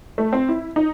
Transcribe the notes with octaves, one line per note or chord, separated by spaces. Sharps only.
A3
C4
E4
D#4